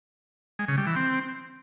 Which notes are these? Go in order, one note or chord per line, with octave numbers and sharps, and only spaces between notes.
G#3
C#3
G3
E3
C4